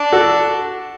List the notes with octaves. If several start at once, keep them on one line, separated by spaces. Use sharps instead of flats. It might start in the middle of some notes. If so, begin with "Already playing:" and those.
Already playing: D4
F#4 A4